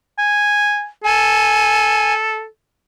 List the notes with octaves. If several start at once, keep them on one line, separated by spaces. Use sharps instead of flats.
G#5
A4 G#5